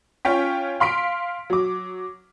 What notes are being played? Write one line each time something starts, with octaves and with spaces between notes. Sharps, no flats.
C#4 F4 C#5 G5 B6
F5 C6 B6 D7
F#3 D6